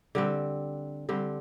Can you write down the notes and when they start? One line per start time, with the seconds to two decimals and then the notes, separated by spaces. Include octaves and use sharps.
0.15 D3 G3 C4
1.09 D3 G3 C4